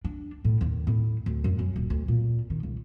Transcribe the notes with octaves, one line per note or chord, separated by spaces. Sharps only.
D4
A2
D#2
A2
D2
F#2
F#2
D#1
D2
A#2
D#3
C#2